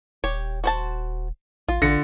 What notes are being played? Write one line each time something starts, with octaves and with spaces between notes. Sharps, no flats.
D#1 G4 C#5
F#4 C5 A5
A1 F4
A1 D3 A#6 C#7